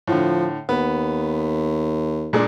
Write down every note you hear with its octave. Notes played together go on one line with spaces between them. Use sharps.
A2 D3 F3
D#2 B3
A#2 G#3 D4